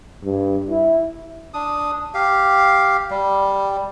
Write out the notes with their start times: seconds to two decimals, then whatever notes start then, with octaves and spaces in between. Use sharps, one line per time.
0.23 G2
0.69 E4
1.54 D4 D#6
2.14 G4 F5
3.11 G3